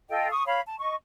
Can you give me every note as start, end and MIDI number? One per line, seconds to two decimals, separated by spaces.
0.10 0.29 65
0.10 0.29 69
0.10 0.29 75
0.10 0.29 79
0.30 0.44 85
0.30 0.44 87
0.46 0.60 73
0.46 0.60 77
0.46 0.60 83
0.66 0.77 81
0.79 0.95 75
0.79 0.95 85